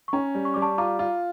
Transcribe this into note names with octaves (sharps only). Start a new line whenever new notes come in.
C#6
C#4 G5 A#5
G3
C#6
G3 D6
A5 C#6
F4 A#5 D6
F4